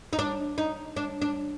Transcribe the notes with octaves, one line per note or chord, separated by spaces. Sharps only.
D#4
D4
D#4
D4
D4